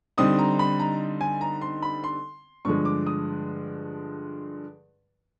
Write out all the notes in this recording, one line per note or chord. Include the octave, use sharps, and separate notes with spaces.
D3 G3 C4 D#4 D#6
A#5
B5
A#5
G#5
A#5
C6
B5
C6
G2 D3 F3 G#3 C#6
D6
D#6